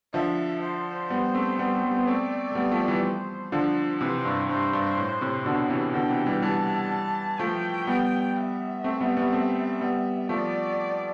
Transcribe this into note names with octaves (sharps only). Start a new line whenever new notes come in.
D3 F3 E5
C5
G3 B3
A3 C4
G3 B3
G3 B3
B3
A3 C4 D5
A3
G3 B3
F3 A3
E3 G3
C5
D3 F3
C3 E3 C5
G2
G2 C5
G2
A2
A2 C3
B2 D3
C3 E3
B2 D3 G5
C3 E3
E3 G3
E3 G3 A5
F3 A3 G5
G3 B3
E5
A3 C4
G3 B3
G3 B3
A3 C4
G3 B3
F3 A3 D5